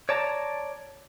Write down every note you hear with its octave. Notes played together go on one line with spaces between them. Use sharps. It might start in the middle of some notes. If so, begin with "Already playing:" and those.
C#5 D5 A5 A#5